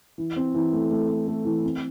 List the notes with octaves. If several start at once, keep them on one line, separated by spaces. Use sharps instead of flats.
E3
C4
E3
A3
A3
A3
A3
E3
C4